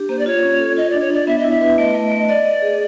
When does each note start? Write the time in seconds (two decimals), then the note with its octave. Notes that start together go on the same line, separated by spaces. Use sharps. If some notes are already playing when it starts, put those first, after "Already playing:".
Already playing: D4 G4
0.09 A#3 C5
0.18 D5
0.26 F4 C#5
0.43 C#4
0.60 A4
0.77 F4 D#5
0.89 D4 D5
1.00 C#5
1.10 D4 D5
1.27 B3 E5
1.38 D#5
1.44 E4
1.50 E5
1.61 B4
1.78 A3 D#5
1.94 A3
2.11 A3
2.28 D5 D#5
2.45 D#5
2.62 G#4